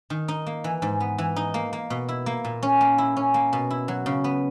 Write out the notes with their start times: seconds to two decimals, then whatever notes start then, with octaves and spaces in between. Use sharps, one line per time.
0.10 D#3
0.28 D#4
0.47 A#3
0.64 E3
0.82 G#2
1.00 B3
1.18 E3
1.36 D#4
1.54 A#3
1.73 A#3
1.90 B2
2.09 E4
2.26 A#3
2.44 A#2
2.63 C#4
2.81 A#3
2.98 E4
3.17 C#4
3.34 A#3
3.53 B2
3.70 E4
3.88 F#3
4.06 C#3
4.24 B3